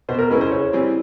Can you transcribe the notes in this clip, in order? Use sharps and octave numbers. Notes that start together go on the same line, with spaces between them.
B2 C5
A#4
G#3 C#4 E4 B4
C5
C#3 C#5
E3 G3 C4